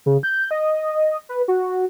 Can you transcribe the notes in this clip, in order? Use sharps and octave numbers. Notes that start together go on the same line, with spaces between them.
C#3
G6
D#5
B4
F#4